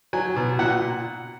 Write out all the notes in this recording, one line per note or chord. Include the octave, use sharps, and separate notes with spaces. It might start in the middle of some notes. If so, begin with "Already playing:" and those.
F#3 G#5
B2
A#2 F#5